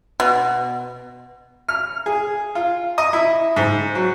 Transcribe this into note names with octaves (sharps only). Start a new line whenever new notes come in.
B2
F6
G#4
F4
D#5
E4
G#2
F#3